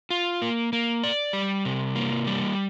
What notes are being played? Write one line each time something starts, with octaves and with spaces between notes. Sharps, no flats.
F4
A#3
A#3
D5
G3
C3
A#3
G3